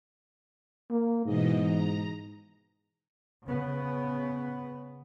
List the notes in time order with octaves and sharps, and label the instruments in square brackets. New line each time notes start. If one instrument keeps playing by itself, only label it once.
[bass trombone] A#3
[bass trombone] G#2 [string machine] B2 E3 D#5
[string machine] A#5
[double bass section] C#3 B3